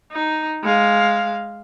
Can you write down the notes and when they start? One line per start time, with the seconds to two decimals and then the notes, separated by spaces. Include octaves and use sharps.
0.12 D#4
0.64 G#3 F5